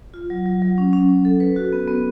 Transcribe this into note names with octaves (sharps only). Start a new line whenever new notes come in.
F4
F#3
F#3
F#3
C#4
C#4
C#4
A4
B4
F#4
B3
B3